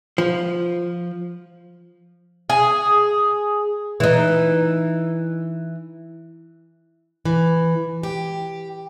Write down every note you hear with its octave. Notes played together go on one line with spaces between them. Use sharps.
F3
G#4
E3 D#4
E3
G4